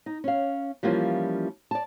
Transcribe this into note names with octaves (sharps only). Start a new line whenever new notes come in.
D#4
C#4 F5
E3 F3 G3 A#3 C#4 F4
D5 A5